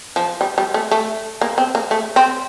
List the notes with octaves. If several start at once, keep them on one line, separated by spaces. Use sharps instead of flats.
F3
G3
G3
A3
A3
A#3
C4
A#3
A3
C4